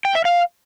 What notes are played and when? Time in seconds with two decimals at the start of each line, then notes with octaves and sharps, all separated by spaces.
0.05 G5
0.15 E5
0.25 F5